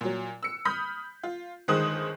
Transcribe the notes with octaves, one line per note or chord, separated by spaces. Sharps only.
A#2 F#3
E6 C#7
B5 D#6 F6 G6 B6
F4
G1 D#3 G#3 C5 D#6 F#6